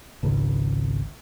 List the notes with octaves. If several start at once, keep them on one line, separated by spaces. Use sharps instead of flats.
G#1 C#2